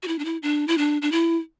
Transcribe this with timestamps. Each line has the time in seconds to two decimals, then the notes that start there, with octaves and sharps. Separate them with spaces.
0.03 F#4
0.08 E4
0.19 D4
0.25 E4
0.43 D4
0.68 E4
0.78 D4
1.02 D4
1.12 E4